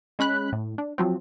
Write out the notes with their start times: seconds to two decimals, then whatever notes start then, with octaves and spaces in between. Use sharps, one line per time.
0.19 G#3 C#4 B5 F#6
0.52 A2
0.78 D4
0.98 F3 F#3 C4